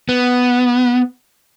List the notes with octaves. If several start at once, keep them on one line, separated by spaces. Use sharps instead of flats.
B3